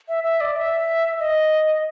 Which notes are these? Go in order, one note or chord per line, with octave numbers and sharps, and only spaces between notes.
E5
E5
D5
E5
D#5